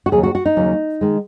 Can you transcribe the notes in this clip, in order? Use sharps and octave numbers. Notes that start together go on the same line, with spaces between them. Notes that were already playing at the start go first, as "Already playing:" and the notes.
F#4
D#2 C#3 F#3 G#4
F#4
F#4
D#4
D#2 C#3 F#3
D#3 G#3